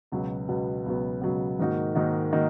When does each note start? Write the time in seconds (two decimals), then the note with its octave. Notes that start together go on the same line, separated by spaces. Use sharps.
0.12 C#2 B2 F#3 B3
0.48 C#2 B2 F#3 B3
0.86 C#2 B2 F#3 B3
1.22 C#2 B2 F#3 B3
1.59 G#2 D#3 A#3 D#4 F#4
1.95 G#2 D#3 A#3 D#4 F#4
2.32 D#3 A#3 D#4 F#4